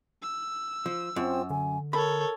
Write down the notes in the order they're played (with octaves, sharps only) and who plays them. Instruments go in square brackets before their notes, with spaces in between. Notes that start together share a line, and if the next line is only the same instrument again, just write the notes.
[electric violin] E6
[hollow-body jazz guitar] F3
[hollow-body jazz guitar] F#2 [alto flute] C4 [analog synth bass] F4
[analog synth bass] D3 [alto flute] G#5
[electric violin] A4 C#5 [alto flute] A#4 [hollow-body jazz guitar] B5